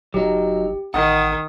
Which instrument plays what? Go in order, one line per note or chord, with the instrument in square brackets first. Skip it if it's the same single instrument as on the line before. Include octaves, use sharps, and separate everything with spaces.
[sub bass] F#1 [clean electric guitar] F#3 D#4 [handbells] G4
[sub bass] A1 [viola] D#3 [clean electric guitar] D#5 F#5 [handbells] D#6